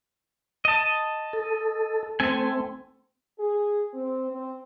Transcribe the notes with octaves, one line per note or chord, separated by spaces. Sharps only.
D#5 A5
A4
A3 C4 A4 G#5
G#4
C4
C4